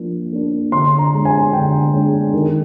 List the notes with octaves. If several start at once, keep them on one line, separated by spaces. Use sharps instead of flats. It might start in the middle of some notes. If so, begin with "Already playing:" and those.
Already playing: F3 A#3 D4
A#3 D4
D3 C6
A#5
G#3 D4
G#5
D3 G5
G#3 D4
D#3